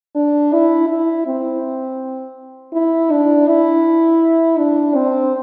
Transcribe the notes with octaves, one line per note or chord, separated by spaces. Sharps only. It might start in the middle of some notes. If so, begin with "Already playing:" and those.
D4
E4
E4
C4
E4
D4
E4
D4
C4